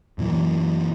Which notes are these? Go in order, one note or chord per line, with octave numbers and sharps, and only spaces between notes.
F#2 A#2 E3